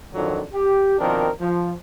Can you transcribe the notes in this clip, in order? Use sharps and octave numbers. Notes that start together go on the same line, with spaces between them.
F2 D3 D#3 F3 F#3 D4
G4
B2 D#3 F3 C4 D4 A#4
F3